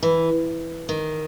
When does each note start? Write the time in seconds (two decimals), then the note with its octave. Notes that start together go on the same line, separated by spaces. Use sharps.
0.03 E3
0.89 D#3